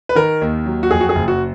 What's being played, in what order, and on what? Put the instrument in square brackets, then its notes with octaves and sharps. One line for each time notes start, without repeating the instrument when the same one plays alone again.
[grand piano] B4
D#3 A#4
D#2
F#3
F#4
F2 G#4
F#4
G#4
F#1
F#4